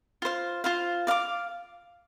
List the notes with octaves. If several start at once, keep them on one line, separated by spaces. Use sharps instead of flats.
F4 C5 F5
F4 C5 F5
D5 F5 D6